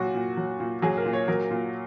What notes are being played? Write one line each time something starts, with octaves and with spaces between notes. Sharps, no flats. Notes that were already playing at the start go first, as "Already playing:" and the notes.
Already playing: A#2 F#3 F#4
A#2
F#3
A#2
F#3 G#4
A#4
A#2
C#5
F#3 A#4
A#2